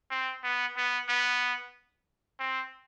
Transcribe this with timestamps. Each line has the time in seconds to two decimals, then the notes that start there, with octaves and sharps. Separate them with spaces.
0.11 C4
0.43 B3
0.77 B3
1.09 B3
2.40 C4